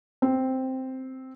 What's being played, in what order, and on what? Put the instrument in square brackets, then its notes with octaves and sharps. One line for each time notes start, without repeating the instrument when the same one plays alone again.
[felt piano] C4